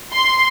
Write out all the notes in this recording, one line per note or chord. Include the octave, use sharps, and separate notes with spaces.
C6